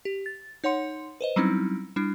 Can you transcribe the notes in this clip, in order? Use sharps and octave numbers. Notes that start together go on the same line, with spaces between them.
G4
A6
D#4 C#5 F#5 C6 C#7
B4 C5 D#5
F#3 G3 C4 C#4 D#4 E4
G3 D4 E4